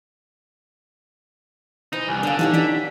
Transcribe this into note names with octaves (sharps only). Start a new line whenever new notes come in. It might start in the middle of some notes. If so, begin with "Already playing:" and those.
E3 D#4 C5
C2 G#5
D3 D4 F4
E3 D4 D#4 G4 C#5
G4 D5 G5 B6